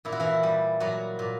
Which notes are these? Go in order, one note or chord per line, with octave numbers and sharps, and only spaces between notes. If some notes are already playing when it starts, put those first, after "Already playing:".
A#2 E4
F#4
E3 E4
G3
A#2 F#3 F#4
A#2